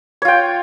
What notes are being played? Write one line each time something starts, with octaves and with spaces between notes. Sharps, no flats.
F4 C#5 G5